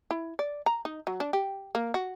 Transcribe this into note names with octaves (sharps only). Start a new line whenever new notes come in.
E4
D5
A#5
D#4
F#3
D4
G4
A#3
F#4